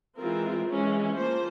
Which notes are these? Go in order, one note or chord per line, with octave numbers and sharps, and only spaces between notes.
E3 G#3 C4 F4 A#4
E3 G#3 C#4
F3 A#3 F4 C5